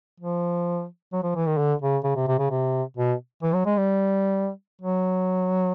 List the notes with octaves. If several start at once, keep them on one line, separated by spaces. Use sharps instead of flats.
F3
F#3
F3
E3
D#3
D3
C#3
C#3
C3
C3
C#3
C3
B2
E3
F#3
G#3
G3
F#3